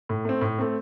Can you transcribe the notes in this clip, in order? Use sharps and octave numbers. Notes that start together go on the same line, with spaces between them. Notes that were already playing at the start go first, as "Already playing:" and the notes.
A2
A3 C4
A2
A3 C4